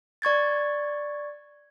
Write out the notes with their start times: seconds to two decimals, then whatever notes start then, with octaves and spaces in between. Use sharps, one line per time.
0.22 D5 C#6 G#6 A6